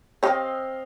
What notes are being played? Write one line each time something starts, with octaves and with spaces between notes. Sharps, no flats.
C4 G4 C#5 D#5 F5